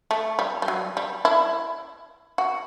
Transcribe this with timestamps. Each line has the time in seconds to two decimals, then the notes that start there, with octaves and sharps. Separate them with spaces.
0.11 A3
0.39 G3
0.62 G3
0.68 F#3
0.97 G3
1.25 E4
2.38 F#4